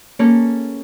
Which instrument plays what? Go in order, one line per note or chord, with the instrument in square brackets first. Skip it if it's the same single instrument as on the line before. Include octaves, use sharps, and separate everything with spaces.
[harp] A#3 C#4 G#4 A4 C#5